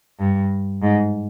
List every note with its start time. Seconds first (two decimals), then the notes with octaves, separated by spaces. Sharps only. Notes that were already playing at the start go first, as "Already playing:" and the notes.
0.19 G2
0.83 G#2